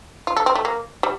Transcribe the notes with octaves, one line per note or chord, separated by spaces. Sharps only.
F4
A4
C4
A3
A#3
G3